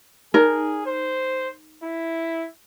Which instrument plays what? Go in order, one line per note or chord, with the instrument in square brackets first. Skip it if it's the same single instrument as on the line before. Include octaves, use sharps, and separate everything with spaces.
[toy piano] D#4 D5 [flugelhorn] G#4 [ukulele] A#4
[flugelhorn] C5
E4